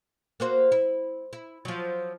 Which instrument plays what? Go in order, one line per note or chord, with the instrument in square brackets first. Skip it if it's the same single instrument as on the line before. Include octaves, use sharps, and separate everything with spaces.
[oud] A#3 F#4 C5
E4
E4
F3 F#3